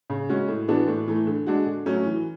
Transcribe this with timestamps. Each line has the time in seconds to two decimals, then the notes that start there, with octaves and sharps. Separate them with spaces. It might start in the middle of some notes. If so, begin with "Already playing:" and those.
0.10 C#3
0.29 G#3 C#4 F#4
0.48 A2
0.68 E3 B3 D4 F#4
0.88 A2
1.08 E3 A3
1.27 D3
1.47 G#3 D4 F#4
1.66 D3
1.86 F#3 A3 C#4
2.06 E3